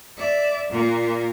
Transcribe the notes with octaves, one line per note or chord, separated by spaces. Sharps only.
D5 E5
A#2 A#3